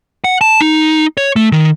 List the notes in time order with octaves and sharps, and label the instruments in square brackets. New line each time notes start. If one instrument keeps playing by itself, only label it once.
[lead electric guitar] F#5
A5
D#4
C#5
A3
D#3